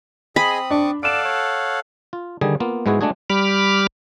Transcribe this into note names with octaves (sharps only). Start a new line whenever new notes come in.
C4 G#4 D#5 B5 D#6
D4 C#6 D6
A4 D5 F5 F#5 D7 E7
C#5
F4
D3 D#3 G3 G#4
A#3 B3 F4
G#2 G#3 B3 E4 F#4 G#4
G#3 A3 D4 F#4 G#4
G3 B5 D6 F6